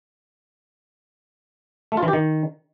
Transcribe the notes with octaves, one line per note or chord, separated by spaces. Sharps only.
A3
F4
E3
G4
D#3